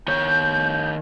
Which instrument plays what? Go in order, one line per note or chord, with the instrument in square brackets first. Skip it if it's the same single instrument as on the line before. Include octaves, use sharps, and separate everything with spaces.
[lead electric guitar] D#3 C#5 [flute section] G6